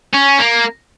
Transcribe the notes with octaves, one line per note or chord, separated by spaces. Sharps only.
C#4
A#3